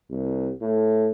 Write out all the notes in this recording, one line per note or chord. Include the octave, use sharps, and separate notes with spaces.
C2
A2